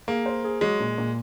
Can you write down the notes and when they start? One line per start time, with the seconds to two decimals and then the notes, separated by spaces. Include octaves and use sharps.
0.08 A#3 G#4
0.26 C5
0.44 G#4
0.61 F#3 G#3
0.80 A#2
0.98 A#2